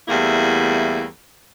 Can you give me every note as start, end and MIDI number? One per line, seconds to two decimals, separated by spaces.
0.08 1.03 40
0.08 1.03 55
0.08 1.03 57
0.08 1.03 58
0.08 1.03 64